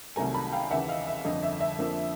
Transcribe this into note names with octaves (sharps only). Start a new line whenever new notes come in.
C2 C3 D#3 F#3 A3 G#5 A#5
A5 B5
F5 G5
D#2 C#3 E3 E5 F#5
D#5 F5
E5
G1 F2 D3 D#5
E5
E5
F2 D3 F3 A#3